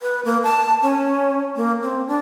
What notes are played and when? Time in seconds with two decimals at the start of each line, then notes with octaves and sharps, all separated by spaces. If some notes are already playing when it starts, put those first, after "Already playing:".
0.01 B4
0.25 A#3
0.43 A5
0.82 C#4
1.56 A#3
1.82 C4
2.08 D4